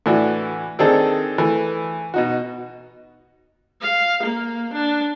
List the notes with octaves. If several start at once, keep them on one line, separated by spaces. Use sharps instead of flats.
A2 E3 D4 F#4
D#3 C4 D4 D#4 G#4 A4
E3 A3
B2 D#4 F#4
F5
A#3
D4